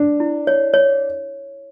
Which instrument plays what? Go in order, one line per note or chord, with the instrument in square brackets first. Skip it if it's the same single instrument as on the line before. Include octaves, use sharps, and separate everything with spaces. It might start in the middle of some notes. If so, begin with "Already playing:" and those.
Already playing: [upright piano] D4
[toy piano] E4
C#5
C#5